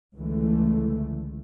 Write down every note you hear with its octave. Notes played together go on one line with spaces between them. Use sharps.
C#2 D3 E3 A3